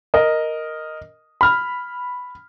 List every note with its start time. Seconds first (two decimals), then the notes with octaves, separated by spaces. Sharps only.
0.14 A#4 D#5
1.41 B5 F6